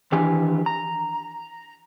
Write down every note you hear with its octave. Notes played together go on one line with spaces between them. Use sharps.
D#3 E3 D4 G4 G#5
A#5